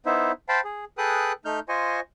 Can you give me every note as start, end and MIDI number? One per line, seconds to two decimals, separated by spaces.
0.06 0.32 59
0.06 0.32 63
0.06 0.32 64
0.06 0.32 72
0.06 0.32 76
0.49 0.61 72
0.49 0.61 77
0.49 0.61 79
0.49 0.61 81
0.49 0.61 83
0.65 0.85 68
0.98 1.32 68
0.98 1.32 69
0.98 1.32 71
0.98 1.32 79
0.98 1.32 87
0.98 1.32 90
1.45 1.60 57
1.45 1.60 63
1.45 1.60 89
1.45 1.60 91
1.69 2.00 65
1.69 2.00 72
1.69 2.00 75
1.69 2.00 80
1.69 2.00 85